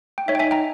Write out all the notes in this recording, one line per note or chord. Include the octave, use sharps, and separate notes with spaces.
G5
D#4 C#5 E5
G5
E5 G#5
G5 A#5